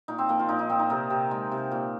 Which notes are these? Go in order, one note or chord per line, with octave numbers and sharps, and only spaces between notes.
A#2 D#4
C4
F3 A#3
F4
A#2 D#4
D#4
A#2 C4
D#4
C3 A#4
C3
G#3
C3
A#2